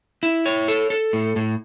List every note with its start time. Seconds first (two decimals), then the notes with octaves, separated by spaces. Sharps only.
0.23 E4
0.46 C#5
0.68 A4
0.90 A4
1.13 A2
1.36 A2